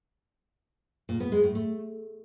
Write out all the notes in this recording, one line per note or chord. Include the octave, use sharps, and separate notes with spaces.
A#2
B3
G#3
A2
A3